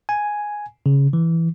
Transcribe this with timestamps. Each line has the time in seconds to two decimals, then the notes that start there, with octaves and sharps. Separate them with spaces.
0.09 G#5
0.86 C#3
1.13 E3